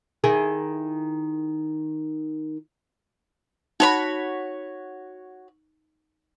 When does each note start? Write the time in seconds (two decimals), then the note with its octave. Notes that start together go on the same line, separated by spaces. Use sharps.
0.24 D#3 E4 G#4
3.80 D#4 F#4 C#5 B5